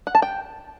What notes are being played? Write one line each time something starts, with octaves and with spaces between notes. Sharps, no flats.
F#5
A5
G5